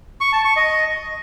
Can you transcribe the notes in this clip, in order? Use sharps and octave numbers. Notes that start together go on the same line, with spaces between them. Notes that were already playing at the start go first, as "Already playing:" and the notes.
C#6
A5
C#6
D#5